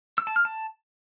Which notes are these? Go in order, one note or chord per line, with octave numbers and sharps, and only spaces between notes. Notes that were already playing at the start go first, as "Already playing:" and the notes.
E6
A5
F6
A5